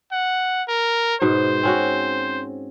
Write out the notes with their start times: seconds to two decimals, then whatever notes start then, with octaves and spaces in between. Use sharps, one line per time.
0.12 F#5
0.68 A#4
1.22 G#2 B2 C5
1.63 C4 C#4 F#4